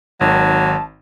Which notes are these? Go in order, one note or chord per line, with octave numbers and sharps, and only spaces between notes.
G#1 D#3 F#3 A5